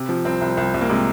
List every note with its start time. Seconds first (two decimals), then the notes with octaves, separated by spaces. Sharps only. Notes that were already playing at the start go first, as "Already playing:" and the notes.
Already playing: C3
0.09 F3
0.25 C2 C4
0.41 C2
0.57 C2
0.74 C2
0.81 A#3
0.89 C3 G#3